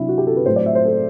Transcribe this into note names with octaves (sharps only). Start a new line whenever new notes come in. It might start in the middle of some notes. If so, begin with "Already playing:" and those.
Already playing: C3 F#3 D4 E4
F#4
G4
A4
B4
A2 F#3 C5
D5
E5
C5
A4